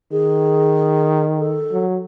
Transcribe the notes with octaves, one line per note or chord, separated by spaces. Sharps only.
D#3 G#4
A4
F#3